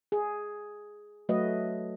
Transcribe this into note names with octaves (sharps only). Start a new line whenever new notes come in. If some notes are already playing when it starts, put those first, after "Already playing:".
G#4
F#3 A3 F#4 B4 D#5